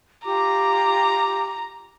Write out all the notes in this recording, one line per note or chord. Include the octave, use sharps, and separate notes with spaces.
F4 G4 A#5 D6